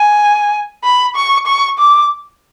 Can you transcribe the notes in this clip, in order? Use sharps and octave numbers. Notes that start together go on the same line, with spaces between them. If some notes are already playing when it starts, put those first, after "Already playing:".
Already playing: G#5
B5
C#6
C#6
D6